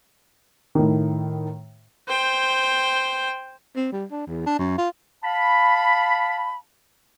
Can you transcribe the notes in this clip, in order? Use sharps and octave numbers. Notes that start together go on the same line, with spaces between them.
A2 D#3
C5 G5
C4
G3
D4
E2
D4
F#2
F4
F5 A5 B5